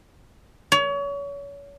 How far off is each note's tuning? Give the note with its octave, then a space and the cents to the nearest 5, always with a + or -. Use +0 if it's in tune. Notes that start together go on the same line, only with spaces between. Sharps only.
C#5 +30